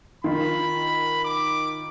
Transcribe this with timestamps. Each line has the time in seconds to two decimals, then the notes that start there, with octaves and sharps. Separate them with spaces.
0.24 D#3 F4 B5
1.24 D6